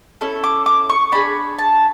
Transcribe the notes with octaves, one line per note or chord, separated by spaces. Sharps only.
C#4 E4 A4
D6
D6
C#6
D4 G#4 B5
A5